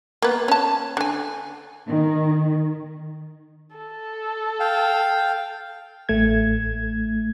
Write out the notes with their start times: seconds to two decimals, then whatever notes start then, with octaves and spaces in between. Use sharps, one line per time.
0.22 A#3 B3
0.48 C#4 A5
0.97 D3 G#5
1.87 D#3
3.76 A4
4.60 F5 G5
6.09 A1 A3 G#6